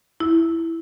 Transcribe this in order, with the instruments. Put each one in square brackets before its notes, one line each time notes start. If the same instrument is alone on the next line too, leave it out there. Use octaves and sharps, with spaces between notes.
[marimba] E4